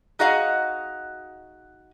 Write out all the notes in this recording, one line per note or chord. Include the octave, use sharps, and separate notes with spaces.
D#4 F#4 G#4 D#5 F5 F#5